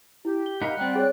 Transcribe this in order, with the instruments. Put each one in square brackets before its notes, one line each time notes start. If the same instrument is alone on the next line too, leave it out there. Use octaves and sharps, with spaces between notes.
[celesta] E4 [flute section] G4
[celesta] G7
[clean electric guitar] D#4 A#4 F5 [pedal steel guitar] F#5 A#5 B5
[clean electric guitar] G3 C4 [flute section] D5 G5 F#6
[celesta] G#4 C#5